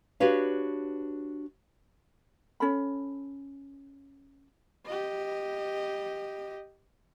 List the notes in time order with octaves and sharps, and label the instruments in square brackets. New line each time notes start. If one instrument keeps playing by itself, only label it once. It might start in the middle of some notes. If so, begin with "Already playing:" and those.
[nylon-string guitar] D4 F#4 G4 B4 C#5 F5
[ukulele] C#4 A4 B5
[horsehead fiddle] G4 D#5